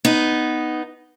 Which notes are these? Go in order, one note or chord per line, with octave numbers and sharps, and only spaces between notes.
B3 D#4